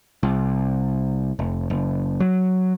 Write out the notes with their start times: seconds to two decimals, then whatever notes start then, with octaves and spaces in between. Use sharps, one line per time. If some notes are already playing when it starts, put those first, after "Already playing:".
0.23 C2
1.39 F1
1.70 F#1
2.20 F#3